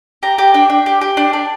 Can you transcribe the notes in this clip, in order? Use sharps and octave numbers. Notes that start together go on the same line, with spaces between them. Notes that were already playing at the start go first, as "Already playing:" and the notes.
G4 A#5
G4
D4 G5
D4
G4
G4
D4
D4